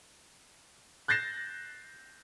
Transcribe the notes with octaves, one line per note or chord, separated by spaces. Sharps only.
F#6 G6 A6 A#6 C7 E7